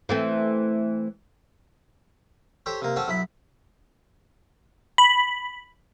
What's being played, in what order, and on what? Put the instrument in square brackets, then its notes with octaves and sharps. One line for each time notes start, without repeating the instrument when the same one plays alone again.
[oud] E3 A3 C4
[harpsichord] G4 A4 C5 C#5
C3 A#3
C4 C#4 A4 F#5 A5
B1 E4 B5
[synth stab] B5